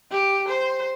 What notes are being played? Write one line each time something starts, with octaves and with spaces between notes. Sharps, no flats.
G4
C5